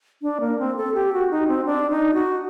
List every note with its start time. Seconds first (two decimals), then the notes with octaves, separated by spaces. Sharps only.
0.22 D4
0.40 A#3
0.59 C4
0.77 A4
0.94 G4
1.13 F#4
1.31 D#4
1.48 C4
1.66 D4
1.90 D#4
2.14 F#4